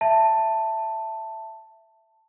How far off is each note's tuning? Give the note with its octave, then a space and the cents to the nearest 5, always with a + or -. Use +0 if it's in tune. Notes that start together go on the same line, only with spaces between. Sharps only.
E5 +5 A5 +10